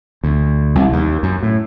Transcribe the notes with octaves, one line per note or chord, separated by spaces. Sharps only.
D2
C2
D#2
F#2
A2